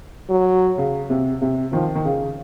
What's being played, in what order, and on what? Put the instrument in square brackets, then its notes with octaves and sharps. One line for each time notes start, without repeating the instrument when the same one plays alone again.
[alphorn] F#3
[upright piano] C#3
C3
C3
[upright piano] D#3 [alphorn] F3
[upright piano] D#3
C#3